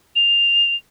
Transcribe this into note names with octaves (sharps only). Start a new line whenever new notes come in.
F7